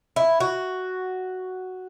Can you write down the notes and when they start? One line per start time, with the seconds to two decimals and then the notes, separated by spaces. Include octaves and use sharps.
0.16 E4
0.40 F#4